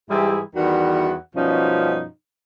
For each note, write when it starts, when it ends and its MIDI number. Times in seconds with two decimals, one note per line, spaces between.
0.10 0.40 44
0.10 0.40 52
0.10 0.40 55
0.10 0.40 64
0.10 0.40 67
0.10 0.40 68
0.55 1.15 40
0.55 1.15 51
0.55 1.15 52
0.55 1.15 55
0.55 1.15 66
0.55 1.15 78
1.35 2.05 42
1.35 2.05 47
1.35 2.05 53
1.35 2.05 55
1.35 2.05 61
1.35 2.05 63